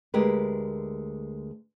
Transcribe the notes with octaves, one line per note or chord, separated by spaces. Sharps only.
D2 G#3 G4 A#4 B4